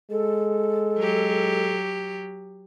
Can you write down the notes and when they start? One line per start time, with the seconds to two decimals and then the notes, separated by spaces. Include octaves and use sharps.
0.11 G#3 A4
0.98 F#3 G4